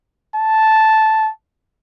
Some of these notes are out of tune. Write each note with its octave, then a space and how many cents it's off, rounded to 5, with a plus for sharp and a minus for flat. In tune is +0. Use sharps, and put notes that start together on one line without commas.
A5 -5